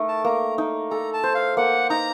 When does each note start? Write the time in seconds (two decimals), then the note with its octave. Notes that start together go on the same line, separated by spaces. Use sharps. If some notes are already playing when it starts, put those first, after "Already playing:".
Already playing: A3 D#4 A#4
0.08 A5
0.24 A#3 A#5
0.58 D#4
0.91 A4 A#5
1.14 A5
1.24 C5
1.35 F5
1.57 A#3 F#5
1.90 D#4 A#5